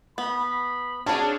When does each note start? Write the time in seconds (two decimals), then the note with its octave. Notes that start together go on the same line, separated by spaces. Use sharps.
0.18 B3 B5
1.06 C#4 D4 F#4 G#4 C#5 A5